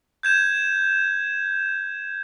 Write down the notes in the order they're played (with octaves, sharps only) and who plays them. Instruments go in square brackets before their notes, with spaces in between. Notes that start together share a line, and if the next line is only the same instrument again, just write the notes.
[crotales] G6 G#6 E7